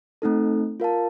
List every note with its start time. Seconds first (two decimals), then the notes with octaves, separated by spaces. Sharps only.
0.22 A3 C4 D#4 A4
0.80 F4 A#4 F5 A5